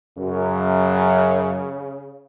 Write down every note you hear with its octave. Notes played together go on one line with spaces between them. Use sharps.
F#2 C#3